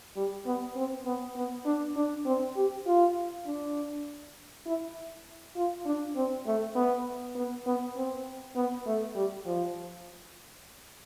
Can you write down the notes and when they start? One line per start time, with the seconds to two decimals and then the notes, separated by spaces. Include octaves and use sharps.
0.16 G3
0.46 B3
0.76 C4
1.05 B3
1.36 B3
1.65 D4
1.96 D4
2.25 C4
2.56 G4
2.86 F4
3.46 D4
4.66 E4
5.56 F4
5.86 D4
6.16 C4
6.46 A3
6.75 B3
7.35 B3
7.66 B3
7.96 C4
8.56 B3
8.86 A3
9.16 G3
9.45 F3